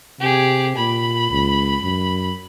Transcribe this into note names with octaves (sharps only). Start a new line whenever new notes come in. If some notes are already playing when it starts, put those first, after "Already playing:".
C3 G4 G#4
A#2 B5
C#2
F#2